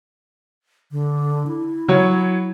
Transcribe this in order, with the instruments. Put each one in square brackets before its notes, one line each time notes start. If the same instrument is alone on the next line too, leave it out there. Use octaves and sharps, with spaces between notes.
[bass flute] D3
E4
[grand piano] F#3 C#5